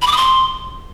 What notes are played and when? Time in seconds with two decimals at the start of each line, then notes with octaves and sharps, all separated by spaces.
0.02 B5
0.07 D6
0.12 D#6
0.17 C6